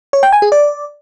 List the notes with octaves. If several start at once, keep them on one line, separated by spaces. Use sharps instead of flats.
C#5
G5
G#5
G#4
D5